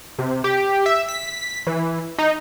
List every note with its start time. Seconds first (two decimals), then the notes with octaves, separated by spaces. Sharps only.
0.19 C3
0.44 G4
0.86 E5
1.08 B6
1.67 E3
2.18 D#4